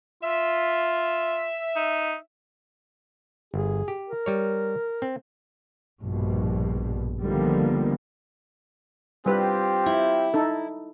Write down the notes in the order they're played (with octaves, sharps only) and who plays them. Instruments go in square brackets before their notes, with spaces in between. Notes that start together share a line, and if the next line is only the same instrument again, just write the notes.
[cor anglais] F4 [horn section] E5
[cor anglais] D#4
[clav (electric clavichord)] G1 [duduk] G#4
[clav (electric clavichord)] G4
[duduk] A#4
[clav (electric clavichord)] G3 C#5
C4
[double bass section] A#1 G2 B2
D3 D#3 F3 G3 A#3 B3
[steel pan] G3 B4 [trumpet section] C4 F4 G4
[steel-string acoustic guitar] E4
[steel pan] D#4 A4